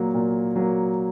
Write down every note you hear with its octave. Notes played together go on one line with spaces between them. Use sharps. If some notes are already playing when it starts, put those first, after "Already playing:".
Already playing: A#2 F#3 A#3
A#2
F#3 A#3